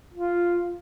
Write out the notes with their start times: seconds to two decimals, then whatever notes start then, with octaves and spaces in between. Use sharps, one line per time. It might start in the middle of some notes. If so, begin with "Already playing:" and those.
0.13 F4